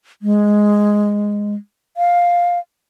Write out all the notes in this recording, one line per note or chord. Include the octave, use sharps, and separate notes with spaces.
G#3
F5